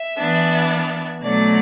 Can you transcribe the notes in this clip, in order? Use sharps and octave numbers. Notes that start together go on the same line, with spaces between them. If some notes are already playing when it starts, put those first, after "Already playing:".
Already playing: E5
E3 B3 D4
B2 F#3 A3 D4 D5